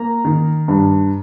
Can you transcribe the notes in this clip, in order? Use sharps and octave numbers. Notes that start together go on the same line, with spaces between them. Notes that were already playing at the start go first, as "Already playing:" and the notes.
Already playing: A#3 A#5
D#3
G2